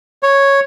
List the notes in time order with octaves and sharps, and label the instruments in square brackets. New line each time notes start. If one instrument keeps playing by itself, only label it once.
[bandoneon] C#5